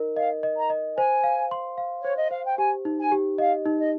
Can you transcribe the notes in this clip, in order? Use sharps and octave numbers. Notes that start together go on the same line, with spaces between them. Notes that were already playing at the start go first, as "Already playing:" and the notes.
Already playing: D#4 A#4 D#5
D#5 F5
D#5
A#5
D#5
C5 G#5
F5
C6
F5
C5 C#5
D#5
C5 F5
G5
G4 G#5
D#4
G#5
G4
D#5 F5
D#4
D#5